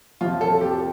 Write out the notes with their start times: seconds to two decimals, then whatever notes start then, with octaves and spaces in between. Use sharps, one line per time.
0.21 F2 C3 F3 F4
0.41 A4
0.61 G4